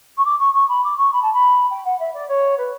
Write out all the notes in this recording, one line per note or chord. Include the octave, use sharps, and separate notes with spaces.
C#6
D6
C#6
C#6
B5
D6
C#6
B5
A5
B5
G5
F#5
E5
D5
C#5
B4